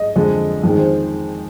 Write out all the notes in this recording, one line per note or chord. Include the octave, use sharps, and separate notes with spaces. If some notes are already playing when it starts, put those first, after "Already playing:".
Already playing: D#5
F2 D3 G#3
F2 D#3 G#3
C5